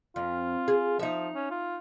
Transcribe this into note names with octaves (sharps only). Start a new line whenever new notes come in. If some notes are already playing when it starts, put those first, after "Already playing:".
F2 F4
G#4
F3 D#4 E5
C#4
F4